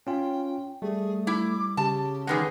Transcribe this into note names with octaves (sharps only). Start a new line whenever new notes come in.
C#4 F4 G5
G3 A3 G#4
E4 D6
C#3 G4 A5
E2 D#3 G#3 G#4 B4 F#5